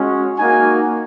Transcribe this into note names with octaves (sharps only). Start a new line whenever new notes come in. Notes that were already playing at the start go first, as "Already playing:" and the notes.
Already playing: G#3 C#4 F#4
A#3 D#4 F#4 G#5